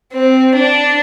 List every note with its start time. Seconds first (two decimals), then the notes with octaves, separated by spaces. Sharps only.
0.12 C4
0.55 D4